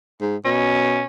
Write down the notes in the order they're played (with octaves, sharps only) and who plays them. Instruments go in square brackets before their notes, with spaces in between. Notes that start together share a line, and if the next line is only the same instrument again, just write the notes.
[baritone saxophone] G#2
[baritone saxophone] B2 [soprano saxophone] C#4